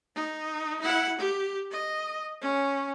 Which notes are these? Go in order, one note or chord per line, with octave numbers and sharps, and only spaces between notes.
D#4
E4 F#5
G4
D#5
C#4